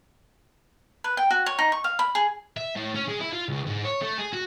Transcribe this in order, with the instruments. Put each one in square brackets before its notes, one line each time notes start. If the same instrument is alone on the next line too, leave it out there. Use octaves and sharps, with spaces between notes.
[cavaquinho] B4
G5
F#4
C#5
D#4
C#6
F5
B5
G#4
[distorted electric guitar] E5
A2
C#4
G#3
E4
F4
C#2
G#2
C#5
A3
G#4
F#4